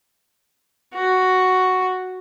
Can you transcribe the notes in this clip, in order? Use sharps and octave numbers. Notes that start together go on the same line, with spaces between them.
F#4